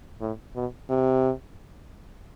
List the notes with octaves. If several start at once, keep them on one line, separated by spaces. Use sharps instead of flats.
A2
B2
C3